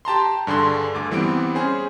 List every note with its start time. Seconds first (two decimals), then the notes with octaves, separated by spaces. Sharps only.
0.05 G4 A5 A#5 C6
0.47 G2 D3 G#4 C6
0.94 D2 D6
1.11 E3 G3 B3 C4 D7
1.55 C#4 G#4 C5